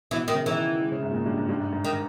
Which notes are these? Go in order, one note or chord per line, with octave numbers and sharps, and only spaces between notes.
B2 E3
D#3
C#3
D#3 E3
G#3
C#3
G#2
A#2
G#2
G2
G#2
G2
G#2
G#2
D#3